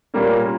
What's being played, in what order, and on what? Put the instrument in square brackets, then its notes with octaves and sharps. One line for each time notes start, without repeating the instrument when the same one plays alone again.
[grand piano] A#2 G3 A#3 C#4